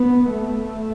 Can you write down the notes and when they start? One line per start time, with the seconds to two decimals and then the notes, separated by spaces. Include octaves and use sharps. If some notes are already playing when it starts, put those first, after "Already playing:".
Already playing: B3
0.31 A3